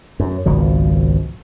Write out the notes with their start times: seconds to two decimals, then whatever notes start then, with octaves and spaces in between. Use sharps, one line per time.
0.20 F#2
0.46 G#1 C#2 B2 F3